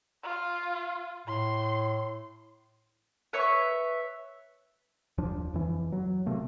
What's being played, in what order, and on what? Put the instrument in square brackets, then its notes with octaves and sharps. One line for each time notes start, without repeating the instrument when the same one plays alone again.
[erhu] F4
[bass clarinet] A2 [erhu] C6
[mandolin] B4 C#5 E5 C#6
[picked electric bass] D#2 F3 D4
F2 E3
F#3
C3 A3 A#3